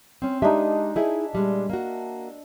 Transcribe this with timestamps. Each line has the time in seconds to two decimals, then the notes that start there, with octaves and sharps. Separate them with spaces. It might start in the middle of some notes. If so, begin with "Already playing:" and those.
0.22 C4 C#4
0.42 G#3 D4 D#4 G4 E5
0.96 D#4 E4 G#4 E5
1.33 A#2 G3 G#3
1.70 A#3 F#4